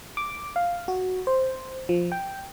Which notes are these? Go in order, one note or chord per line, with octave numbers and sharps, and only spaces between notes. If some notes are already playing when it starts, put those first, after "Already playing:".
D6
F5
F#4
C5
F3
G5